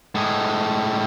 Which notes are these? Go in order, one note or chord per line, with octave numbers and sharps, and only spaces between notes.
A2 G#3